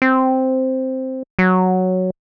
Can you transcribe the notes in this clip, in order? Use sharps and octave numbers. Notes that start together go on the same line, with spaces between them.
C4
F#3